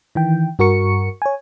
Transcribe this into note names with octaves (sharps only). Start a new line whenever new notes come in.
D#3 E3 G5
G2 F#4 A#4 C#6 C#7
C#5 G#5